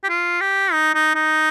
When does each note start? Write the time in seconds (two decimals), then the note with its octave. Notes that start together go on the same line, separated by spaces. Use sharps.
0.03 G4
0.09 F4
0.40 G4
0.72 D#4
0.94 D#4
1.15 D#4